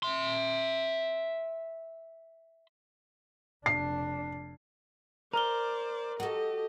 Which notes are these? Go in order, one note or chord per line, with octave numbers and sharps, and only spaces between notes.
E5 C6
F1 D4 C7
A#4 C5 D5 A#5 F6 G7
F#4 G4 A4 D#5